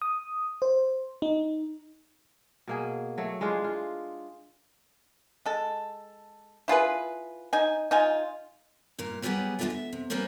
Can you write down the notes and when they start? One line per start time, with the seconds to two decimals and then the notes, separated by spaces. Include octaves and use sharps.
0.02 D#6
0.62 C5
1.22 D#4
2.68 B2 A#3 G#4
3.18 F#3 A3
3.40 E3 G#3 D4 F4
3.64 F4
5.45 G#3 A4
6.68 E4 F4 G#4 B4
7.53 D#4 G#5
7.91 D#4 F4 G#5
8.98 G2 A#2 A#4
9.22 F#3 G3 B3 G4 G#4 F#5
9.59 G#3 D4 E4 F4 A4 E5
9.70 E5
9.93 C3
10.10 G3 A#3 B3 C#4 C5 C#5